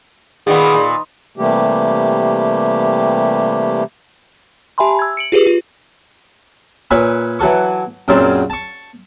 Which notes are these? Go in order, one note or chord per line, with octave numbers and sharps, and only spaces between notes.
A#2 D#3 B3 G#4
A#2
C3 E3 G3 A3 A#3 G4
G4 E5 G#5 A5 B5 C6
E6 G#6
C#7 D7 F#7
F4 G4 G#4 B4
F4
A#2 B4 C#5 E5 G#5 B5
E3 F#3 A4 C#6
F#2 A#2 C#3 F#3 C4 A5
A5 C#6